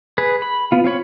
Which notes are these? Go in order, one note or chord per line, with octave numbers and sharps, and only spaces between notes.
G#4 B4
B5
B3 F4
C4 F4 C#5 B5